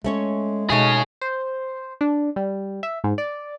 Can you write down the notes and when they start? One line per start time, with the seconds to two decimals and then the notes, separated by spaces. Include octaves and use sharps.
0.04 G#3 A3 C#4 C#5
0.70 B2 G#3 A3 D#4 G#4 C#5
1.21 C5
2.01 D4
2.36 G3
2.83 E5
3.04 G#2
3.18 D5